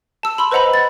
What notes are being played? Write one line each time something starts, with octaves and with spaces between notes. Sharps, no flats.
A5 E6
B5 C6 E6
B4 C5 D#5 F#5 A#5 B5
A6